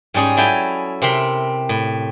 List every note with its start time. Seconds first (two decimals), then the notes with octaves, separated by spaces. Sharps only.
0.14 G#2 G3 C#4 G#4
0.37 F#3 E4 A4 G5 G#5
1.02 C3 C4 A#4 E5 C6
1.69 A2